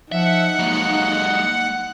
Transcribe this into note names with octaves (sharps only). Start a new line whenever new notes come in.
F3 D#4 E5 F#5
F#3 G#3 A#3